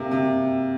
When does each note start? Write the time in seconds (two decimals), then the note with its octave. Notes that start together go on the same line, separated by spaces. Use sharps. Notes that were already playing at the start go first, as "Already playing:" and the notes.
Already playing: C3 A#3
0.11 C3